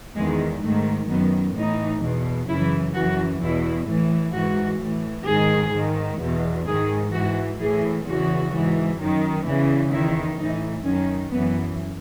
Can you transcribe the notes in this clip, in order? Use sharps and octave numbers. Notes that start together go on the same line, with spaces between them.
E2 D#3 G#3
G#2 D#3 A3
F#2 D#3 B3
A2 E3 D#4
E2 B2
F#2 C#3 E3 E4
F#2 E3 F#4
E2 B2 E4
A2 E3
G#2 E3 F#4
A2 E3
G#2 D#3 G#4
G#2 D#3
E2 B2
G#2 D#3 G#4
G#2 E3 F#4
A2 E3 G#4
E2 C#3 E3 F#4
G#2 E3
F#2 D#3
E2 C#3 E3
E2 D#3 E4
A2 E3 D#4
F#2 D#3 C#4
F#2 E3 B3